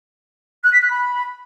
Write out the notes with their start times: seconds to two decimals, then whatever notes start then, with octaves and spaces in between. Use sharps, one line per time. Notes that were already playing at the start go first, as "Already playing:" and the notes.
0.63 F#6
0.72 B6
0.81 F#6
0.90 B5